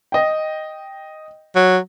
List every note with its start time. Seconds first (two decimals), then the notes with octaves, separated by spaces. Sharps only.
0.12 D#5 G5
1.55 F#3